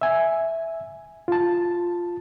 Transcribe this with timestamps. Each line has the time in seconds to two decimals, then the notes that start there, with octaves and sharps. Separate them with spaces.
0.01 E5 G#5
1.28 F4 A5